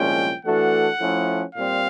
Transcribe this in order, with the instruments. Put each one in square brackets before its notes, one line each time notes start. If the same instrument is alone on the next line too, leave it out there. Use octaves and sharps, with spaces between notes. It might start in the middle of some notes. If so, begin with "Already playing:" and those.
Already playing: [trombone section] C2 A#2 F3 G#3 C#4 [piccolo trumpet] G5
[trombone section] E3 A3 D4 F#4 A4 [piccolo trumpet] F#5
[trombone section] F3 A3 C#4 E4 A4
[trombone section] A#2 G3 C4 [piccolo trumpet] F5